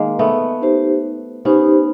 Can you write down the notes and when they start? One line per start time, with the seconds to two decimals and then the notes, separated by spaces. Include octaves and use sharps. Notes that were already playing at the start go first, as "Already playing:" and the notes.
Already playing: D#3 G#3 A#3
0.19 A3 B3
0.62 D#4 G4 C5
1.45 B3 C#4 D#4 G4 C5